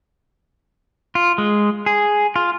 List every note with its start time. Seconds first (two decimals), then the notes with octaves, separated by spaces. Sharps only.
1.15 F4
1.38 G#3
1.86 G#4
2.36 F4